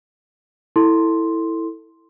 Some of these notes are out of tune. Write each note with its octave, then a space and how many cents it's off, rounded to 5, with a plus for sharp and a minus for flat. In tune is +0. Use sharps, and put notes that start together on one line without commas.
E4 -5 A4 +15 C6 +0